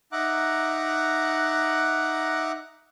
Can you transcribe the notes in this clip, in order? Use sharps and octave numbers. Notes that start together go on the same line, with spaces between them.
D#4 E5 F#5 A#5 D6 F#6